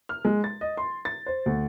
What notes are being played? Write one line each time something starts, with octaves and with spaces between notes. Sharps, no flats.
F6
G#3
A6
D#5
C6
A6
C5
D2